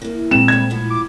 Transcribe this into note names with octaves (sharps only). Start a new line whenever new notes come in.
E3 A#3
A#2 G#3 C4 E7
G3 A3 B3 G#6
A2 F3 B3
D6